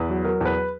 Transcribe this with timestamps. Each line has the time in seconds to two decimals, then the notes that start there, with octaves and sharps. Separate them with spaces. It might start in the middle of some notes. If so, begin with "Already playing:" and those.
Already playing: E2 B4
0.09 F#3
0.24 F#3 A#4
0.41 E2 B4